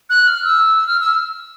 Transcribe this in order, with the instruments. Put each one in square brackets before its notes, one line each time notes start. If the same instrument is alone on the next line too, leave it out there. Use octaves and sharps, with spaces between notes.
[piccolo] F#6
F6
E6
F6
E6